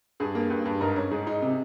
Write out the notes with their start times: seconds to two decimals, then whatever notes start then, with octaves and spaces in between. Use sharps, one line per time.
0.20 G2 G#4
0.35 A#3
0.50 G2
0.65 G2
0.81 G#2 A#4
0.96 C#4
1.11 G#2 G#4
1.27 D#4
1.42 C3